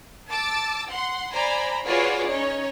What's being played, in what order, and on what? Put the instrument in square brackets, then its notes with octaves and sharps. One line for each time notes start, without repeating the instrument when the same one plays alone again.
[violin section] A5 D6 E6
F#5 C6
C5 D5 G#5 A#5 B5
F4 F#4 G#4 B4 C#5 D5
C#4 D#4 C#5